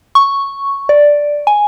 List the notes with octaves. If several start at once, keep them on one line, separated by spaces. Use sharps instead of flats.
C#6
D5
G#5